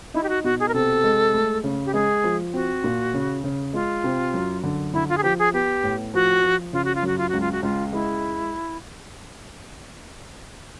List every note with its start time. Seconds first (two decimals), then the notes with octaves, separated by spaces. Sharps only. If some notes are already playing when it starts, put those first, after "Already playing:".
0.14 D#4 E4
0.23 G4
0.29 F#4
0.44 B2 F#4
0.60 G#4
0.68 A#4
0.74 C3 A4
1.04 G#3
1.34 A3
1.64 C#3
1.86 G4
1.94 G#3 G#4
2.24 F3
2.54 C4 F#4
2.84 A#2
3.14 C#3
3.44 C#3
3.73 G#3 F4
4.04 C3
4.34 F#2
4.63 D3
4.93 D3 E4
5.09 F4
5.18 G#4
5.23 F3 G4
5.39 G#4
5.53 B3 G4
5.83 A2
6.14 F3 F#4
6.43 F3
6.73 C#3 F4
6.85 F#4
6.95 F4
7.03 F#2 F#4
7.18 F4
7.29 C#2 F#4
7.41 F4
7.52 F#4
7.63 C#2 F4
7.93 G#3 E4